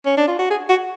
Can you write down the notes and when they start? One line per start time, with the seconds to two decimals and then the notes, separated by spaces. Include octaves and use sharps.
0.06 C#4
0.17 D4
0.28 F4
0.39 F#4
0.51 G#4
0.69 F#4